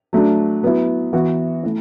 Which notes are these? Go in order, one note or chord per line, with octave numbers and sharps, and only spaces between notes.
F#3 A3 D4
F#3 B3 E4
E3 B3 F#4
A3 E4